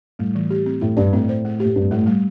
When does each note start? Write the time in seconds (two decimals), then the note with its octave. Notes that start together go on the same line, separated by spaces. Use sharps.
0.19 A2 G3
0.35 E3
0.50 G4
0.66 C4
0.81 A2 E4
0.97 G2 D5
1.13 A2 C4
1.29 C5
1.45 A3
1.60 G4
1.65 A2
1.76 G2 C4
1.91 A2 A3
2.06 G3